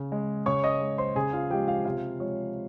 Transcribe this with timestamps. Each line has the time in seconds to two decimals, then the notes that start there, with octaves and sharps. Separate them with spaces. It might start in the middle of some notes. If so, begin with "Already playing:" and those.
Already playing: C#3
0.12 G#3
0.46 C#3 C#5 C#6
0.64 D#5 D#6
0.81 G#3
0.98 C5 C6
1.15 C#3 G#4 G#5
1.33 F4 F5
1.50 F3 G#3 G4 G5
1.68 F4 F5
1.85 C3 F4 F5
2.20 F3 G#3 C#5